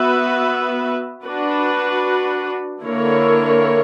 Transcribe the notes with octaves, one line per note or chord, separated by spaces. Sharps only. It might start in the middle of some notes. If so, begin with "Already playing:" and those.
Already playing: B3 F#4 B4 E5
D4 F#4 B4
D3 A#3 E4 A#4 C#5